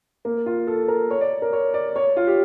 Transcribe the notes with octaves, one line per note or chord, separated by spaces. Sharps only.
A#3
F4
A4
A#4
C#5
D5
A#4
C#5
D5
C#5
F4
G4